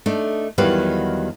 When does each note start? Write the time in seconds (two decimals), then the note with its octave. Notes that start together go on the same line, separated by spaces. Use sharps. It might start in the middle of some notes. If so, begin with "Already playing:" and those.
0.06 A3 D4 D#4
0.58 E2 D#3 F#3 G3 B4 F5